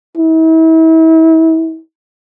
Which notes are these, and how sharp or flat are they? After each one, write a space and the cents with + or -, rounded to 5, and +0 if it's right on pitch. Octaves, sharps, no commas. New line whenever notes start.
E4 -35